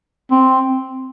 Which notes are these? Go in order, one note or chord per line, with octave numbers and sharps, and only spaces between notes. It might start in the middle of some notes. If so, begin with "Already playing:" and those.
C4